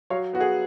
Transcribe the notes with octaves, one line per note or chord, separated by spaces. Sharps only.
F#3 C#5 F5
B3 F#4
G#4